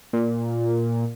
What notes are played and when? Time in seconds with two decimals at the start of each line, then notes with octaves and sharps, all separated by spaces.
0.13 A#2